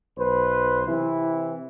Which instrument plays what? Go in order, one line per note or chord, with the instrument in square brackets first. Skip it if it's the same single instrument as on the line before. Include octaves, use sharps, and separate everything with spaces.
[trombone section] B1 B4 C5
C3 E3 E4